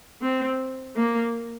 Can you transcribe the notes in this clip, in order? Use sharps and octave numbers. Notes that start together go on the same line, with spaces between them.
C4
A#3